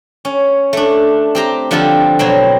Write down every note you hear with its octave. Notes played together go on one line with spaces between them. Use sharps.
C#4
A3 D4
C4 G4 A#5
D3 F3 G3 F4 A4
B2 F#3 C4